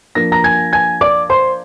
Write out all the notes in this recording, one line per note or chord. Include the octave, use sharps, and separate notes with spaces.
F3 A#3 D4 A#6
A#5 A#6
G#5 G#6
G#5 G#6
D5 D6
C5 C6